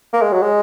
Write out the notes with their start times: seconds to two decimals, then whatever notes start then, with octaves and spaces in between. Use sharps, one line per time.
0.13 A#3
0.22 G#3
0.33 F#3
0.42 G#3